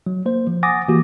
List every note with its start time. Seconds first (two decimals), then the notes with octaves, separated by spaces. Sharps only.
0.06 F#3
0.26 A#3 C5
0.47 F3
0.63 F#5 G#5 D6 D#6 A6 A#6
0.89 E3 A#3 F#4 G4